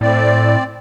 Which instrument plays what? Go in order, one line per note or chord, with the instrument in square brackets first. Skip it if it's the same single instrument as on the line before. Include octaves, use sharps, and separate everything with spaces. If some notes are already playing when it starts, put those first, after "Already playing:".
[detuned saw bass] A2 [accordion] C4 D5